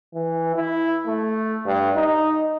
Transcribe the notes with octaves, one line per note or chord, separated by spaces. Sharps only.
E3
E4
A3
G2
D#4